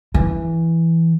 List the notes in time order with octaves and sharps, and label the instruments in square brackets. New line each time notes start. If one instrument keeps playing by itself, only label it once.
[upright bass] E3